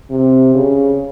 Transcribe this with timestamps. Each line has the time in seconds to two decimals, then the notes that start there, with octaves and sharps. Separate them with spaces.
0.10 C3
0.55 C#3